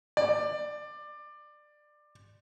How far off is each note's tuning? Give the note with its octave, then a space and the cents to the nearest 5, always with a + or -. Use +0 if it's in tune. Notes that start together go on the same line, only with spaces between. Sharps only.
D5 +20